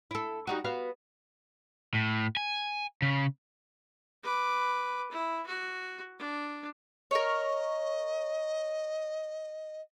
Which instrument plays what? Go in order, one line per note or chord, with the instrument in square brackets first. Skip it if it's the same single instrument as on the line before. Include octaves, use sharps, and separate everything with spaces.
[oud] E4 A4
G3 D#4 F#4
B3 F#4 F5
[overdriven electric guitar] A2
G#5
C#3
[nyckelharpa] B4 D6
E4
F#4
D4
[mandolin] A#4 C#5 [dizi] D#5